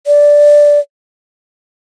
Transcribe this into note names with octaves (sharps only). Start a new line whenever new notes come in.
D5